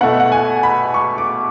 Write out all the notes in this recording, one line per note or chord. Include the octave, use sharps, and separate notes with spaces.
B2 A3 F#5
F#5
G#5
B5
C#6
D6